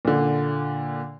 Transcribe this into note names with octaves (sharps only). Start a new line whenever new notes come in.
A#2 D3